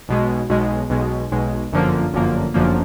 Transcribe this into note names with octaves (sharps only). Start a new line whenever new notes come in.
B1 B2 G#3
B1 B2 G#3
B1 B2 G#3
B1 B2 G#3
G1 F#2 D3 F3 A#3
G1 F#2 D3 F3 A#3
G1 F#2 D3 F3 A#3